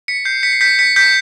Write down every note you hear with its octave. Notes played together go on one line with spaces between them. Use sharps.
B6 C#7
G6 C7
B6 C#7
C7
G6 B6 C#7
B6 C#7
G6 B6